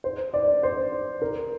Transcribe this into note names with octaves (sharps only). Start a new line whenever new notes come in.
C5
D5
C5
A#4